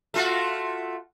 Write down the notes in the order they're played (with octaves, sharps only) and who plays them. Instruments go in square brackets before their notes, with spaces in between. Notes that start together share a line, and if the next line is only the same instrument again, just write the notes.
[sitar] A3 F4 F#4